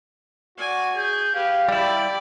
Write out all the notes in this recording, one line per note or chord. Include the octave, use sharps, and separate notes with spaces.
F#4 D5 G#5
G#4 G6
G4 B4 F5
G3 E4 D5 G5 B5